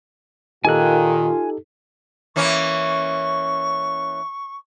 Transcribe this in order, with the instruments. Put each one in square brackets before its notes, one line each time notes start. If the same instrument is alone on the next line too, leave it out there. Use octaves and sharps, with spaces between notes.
[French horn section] A#2 D#3 [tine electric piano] D#4 G4 A4 [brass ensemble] F4 [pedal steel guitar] G#5 F#6
[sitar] E3 A#3 C#4 [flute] C#6